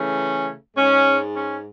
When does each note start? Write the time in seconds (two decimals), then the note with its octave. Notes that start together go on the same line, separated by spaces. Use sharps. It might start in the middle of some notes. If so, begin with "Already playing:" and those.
Already playing: C#3 E3 A3 C#4
0.76 G#2 G#3 C#4
1.35 C#4